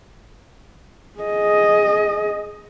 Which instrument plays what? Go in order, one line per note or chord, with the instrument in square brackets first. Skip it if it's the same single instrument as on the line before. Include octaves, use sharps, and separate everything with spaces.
[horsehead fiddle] G#4 D#5